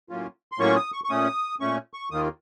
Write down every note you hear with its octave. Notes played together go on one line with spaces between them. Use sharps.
A2 F#3 A#3 C#4 F4
C6
A2 F#3 A#3 C#4 F4 C#6
D#6
C#6
C#6
A#2 A3 C#4 D#6
A#2 A3 C#4 C#6
C#6
D#2 D#3 A#3 F4 D#6